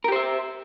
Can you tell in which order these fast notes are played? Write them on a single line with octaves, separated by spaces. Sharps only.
A#4 G4 C5 E5